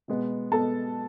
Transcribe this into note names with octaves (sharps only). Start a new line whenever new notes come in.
B2 G#3 B3
B2 G#3 B3 A4 A5